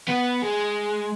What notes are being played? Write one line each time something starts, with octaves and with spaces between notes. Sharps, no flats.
B3
G#3